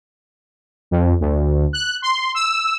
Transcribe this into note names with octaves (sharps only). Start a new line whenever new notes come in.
F2
D2
F#6
C6
E6